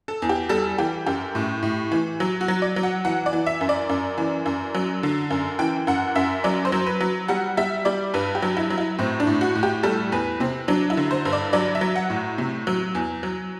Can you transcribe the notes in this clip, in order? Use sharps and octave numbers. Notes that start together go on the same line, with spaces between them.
A4
E2
G4
G3 A4
E3 G4
F#2 G4
A2
A2
E3
F#3
F#4
F#3
D5
F#3
F#5
E3 F#5
D5
E3
E5
F#2
D5
F#2
E3
F#2
F#3
D3
F#2
E3 G5
F#2 F#5
F#2 E5
F#3 D5
C5
F#3
B4
F#3
G3 F#5
G3 E5
G3 D5
G2 B4
G4
F#3
E4
F#3
E4
A2 C4
D4
A2
F#4
A2
G4
G3 A4
E2 B4
C3 C4
F#3 D4
E4
D3
C5
G2
D5
F#3 D5
E5
F#3
F#5
A2
C3
F#3
E2
F#3